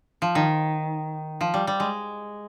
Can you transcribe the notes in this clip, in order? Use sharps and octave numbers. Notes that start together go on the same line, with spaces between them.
F3
D#3
F3
G3
G3
G#3